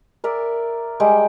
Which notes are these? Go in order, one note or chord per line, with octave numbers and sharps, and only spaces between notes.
A#4 D5 E5
G3 G#3 G5